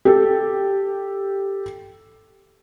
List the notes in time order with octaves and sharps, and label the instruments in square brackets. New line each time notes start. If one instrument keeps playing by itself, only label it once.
[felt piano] G4 A4